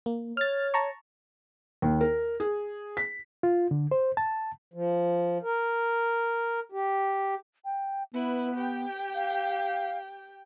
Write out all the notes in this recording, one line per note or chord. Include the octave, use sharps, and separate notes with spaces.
A#3
C#5 F6 A6
A5 A#5 C#6
D#2
A#4
G#4
B6
F4
D3
C5
A5
F3
A#4
G4
G5
B3 E4 B4
G4 G5
F5